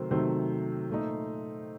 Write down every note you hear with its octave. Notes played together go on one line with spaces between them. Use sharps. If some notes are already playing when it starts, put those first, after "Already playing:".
Already playing: C3 D#3 F#3 A3 A#4 C5
C3 D#3 F#3 A3 C5
A#2 A3 D#4